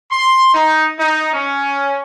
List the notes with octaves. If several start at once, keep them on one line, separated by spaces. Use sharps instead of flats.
C6
D#4
D#4
C#4